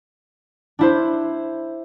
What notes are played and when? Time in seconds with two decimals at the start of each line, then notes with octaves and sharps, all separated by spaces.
0.79 D4 E4 C5